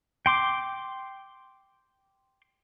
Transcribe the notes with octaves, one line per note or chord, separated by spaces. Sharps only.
G5 C6 D6